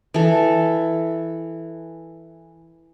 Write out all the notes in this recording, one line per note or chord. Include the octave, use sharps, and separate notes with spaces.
E3 A4